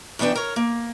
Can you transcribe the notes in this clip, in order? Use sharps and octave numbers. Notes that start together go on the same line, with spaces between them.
F#2 E3 B3 D4 G5
A#4 C#5
A#3